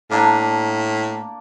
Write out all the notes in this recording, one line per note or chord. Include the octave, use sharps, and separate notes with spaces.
A2 A#3 D4